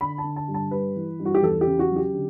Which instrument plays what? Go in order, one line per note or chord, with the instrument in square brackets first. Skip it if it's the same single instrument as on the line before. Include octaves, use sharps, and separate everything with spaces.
[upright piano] D3 B5
A5
D3
A5
G2
A5
G3 B4
E3
G2
F#4
G4
E2 A4
G4
C#3
F#4
F#3
G4
D3